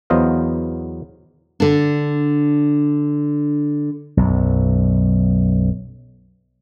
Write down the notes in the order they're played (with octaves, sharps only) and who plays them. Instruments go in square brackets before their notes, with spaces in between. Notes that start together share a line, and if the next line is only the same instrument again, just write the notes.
[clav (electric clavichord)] E2 F#3 B3 C5 D#5 F5
[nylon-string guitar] D3 D4
[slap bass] B1 F#2